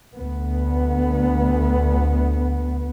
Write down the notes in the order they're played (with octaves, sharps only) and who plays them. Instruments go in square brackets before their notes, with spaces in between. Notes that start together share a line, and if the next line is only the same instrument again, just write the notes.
[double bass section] D2 B3